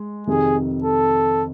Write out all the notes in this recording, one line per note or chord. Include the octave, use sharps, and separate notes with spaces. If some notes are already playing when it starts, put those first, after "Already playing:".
Already playing: G#3
F2 C3 D#3 G#4
A4